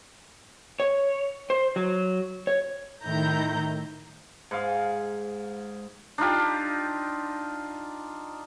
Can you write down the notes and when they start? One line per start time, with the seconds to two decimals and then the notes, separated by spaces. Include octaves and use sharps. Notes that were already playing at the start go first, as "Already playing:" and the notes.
0.80 C#5
1.50 C5
1.76 F#3
2.47 C#5
3.03 A2 D#3 E4 A#5 G6
4.51 G#2 F5
6.18 D4 D#4 F4 G4